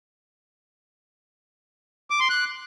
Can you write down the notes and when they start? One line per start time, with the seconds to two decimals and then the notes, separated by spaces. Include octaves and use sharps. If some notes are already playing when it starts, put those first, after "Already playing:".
2.10 D6
2.20 C6
2.30 F#6